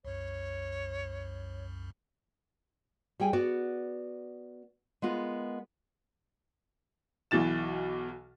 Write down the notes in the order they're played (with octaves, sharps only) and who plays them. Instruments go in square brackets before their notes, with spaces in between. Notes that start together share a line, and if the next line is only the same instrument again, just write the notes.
[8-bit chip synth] C2 F#2 [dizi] C#5
[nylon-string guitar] G3 G#4 G5 G#5
B3 F#4 D5
G#3 B3 F4 A#4
[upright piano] B1 B2 E3 A6 E7